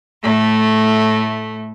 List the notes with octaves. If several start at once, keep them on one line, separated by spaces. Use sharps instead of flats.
A2 A3